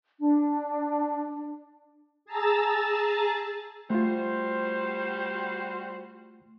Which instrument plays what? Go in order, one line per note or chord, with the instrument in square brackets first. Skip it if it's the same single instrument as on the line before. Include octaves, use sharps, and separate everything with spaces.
[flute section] D4
[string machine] G#4 A5 A#5 E6 A6
[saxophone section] G3 F#4 C5 [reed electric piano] A3 F4